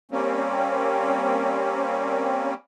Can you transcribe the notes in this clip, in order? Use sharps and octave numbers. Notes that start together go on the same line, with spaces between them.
G3 A#3 C4 C#4